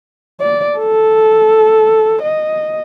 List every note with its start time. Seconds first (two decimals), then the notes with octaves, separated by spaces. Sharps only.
0.41 D5
0.78 A4
2.22 D#5